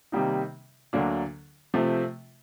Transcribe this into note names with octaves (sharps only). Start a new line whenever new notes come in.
C3 D#3 G3 A#3 D#4
D2 D3 F#3 A#3 D4
C3 F3 A3